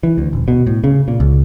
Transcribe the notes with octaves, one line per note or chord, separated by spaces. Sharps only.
E3
D2
D#1
B2
A2
C#3
A#2
C#2